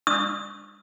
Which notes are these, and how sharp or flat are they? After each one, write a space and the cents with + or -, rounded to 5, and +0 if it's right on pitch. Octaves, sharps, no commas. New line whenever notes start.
D#6 +30